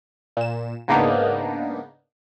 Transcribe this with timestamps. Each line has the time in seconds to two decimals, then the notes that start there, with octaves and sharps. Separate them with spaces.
0.37 A#2 E7
0.88 G#2 C#3 A#3 B3 D4 D#4